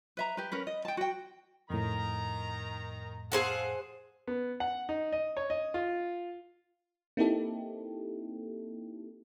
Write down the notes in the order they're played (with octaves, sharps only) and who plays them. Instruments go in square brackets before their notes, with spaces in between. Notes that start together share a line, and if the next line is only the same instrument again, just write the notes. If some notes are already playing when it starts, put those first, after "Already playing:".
[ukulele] B4 E5 A#5
G4 B4
C#4 A#4 B4
D#5
G5 A5
F#4 G5
[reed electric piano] F2 A2 [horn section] D#3 A#5
[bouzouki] G#4 C5 F#5 [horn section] A4 F5
[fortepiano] B3
F#5
D#4
D#5
C#5
D#5
F4
[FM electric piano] A#3 C4 D#4 E4 G4 A4